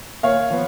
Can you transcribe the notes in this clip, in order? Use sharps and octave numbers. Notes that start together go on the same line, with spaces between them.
A#2 C#5 F5
F3 B3